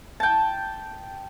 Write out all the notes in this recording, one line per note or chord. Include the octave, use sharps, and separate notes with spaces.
G5 A5